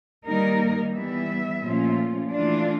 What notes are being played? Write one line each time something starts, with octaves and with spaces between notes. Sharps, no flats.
D#3 G3 A#3 D#4 A#4
E3 G3 B3 E5
A#2 F3 A3 C#4 F4
E3 A3 D4 F4